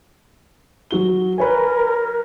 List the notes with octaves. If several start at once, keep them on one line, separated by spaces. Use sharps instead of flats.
F#3 F#4 G7
A#4 B4 C#5 G#5